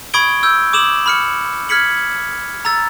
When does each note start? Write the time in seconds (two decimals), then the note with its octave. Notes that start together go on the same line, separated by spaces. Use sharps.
0.14 B5 C#6 D#6 G#6 D7 G7
0.43 E6 G6
0.73 D6 D#6 E7 F#7
1.06 B5 F6 C#7
1.69 F6 G#6 B6 C#7 F#7
2.65 A#5 E6 A6